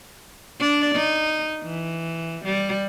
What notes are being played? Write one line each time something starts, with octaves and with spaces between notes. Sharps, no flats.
D4 D5
D#4
E3
G3